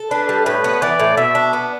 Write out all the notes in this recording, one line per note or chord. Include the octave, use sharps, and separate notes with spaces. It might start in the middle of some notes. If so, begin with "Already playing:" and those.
Already playing: A4
D4 B4
G3
A2 B4
B3
E3 D5
A2
B2 E5
D4
B3